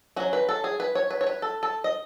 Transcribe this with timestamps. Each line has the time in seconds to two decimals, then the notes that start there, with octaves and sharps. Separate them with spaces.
0.16 F#3 C#4 F#4
0.33 B4
0.49 A4
0.64 G#4
0.80 B4
0.95 C#5
1.11 B4
1.21 C#5
1.27 B4
1.42 A4
1.63 A4
1.84 D#5